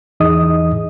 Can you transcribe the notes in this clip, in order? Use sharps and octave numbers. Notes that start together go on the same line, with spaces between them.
E2 E3 D#4 G#4 D#5 D#6